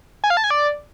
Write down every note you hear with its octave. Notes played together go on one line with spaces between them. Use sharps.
G#5
F5
A5
G#5
D5